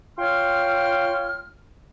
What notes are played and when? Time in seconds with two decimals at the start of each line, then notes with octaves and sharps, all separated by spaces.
0.18 F4 C#5 G5 C6 F6